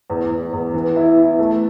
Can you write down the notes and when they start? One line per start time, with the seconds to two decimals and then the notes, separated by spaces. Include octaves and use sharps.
0.10 E2
0.30 E2
0.53 E2
0.74 E3
0.96 E4
1.17 E4
1.39 A3